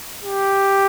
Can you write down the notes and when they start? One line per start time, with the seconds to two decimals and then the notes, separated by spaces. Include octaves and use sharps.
0.23 G4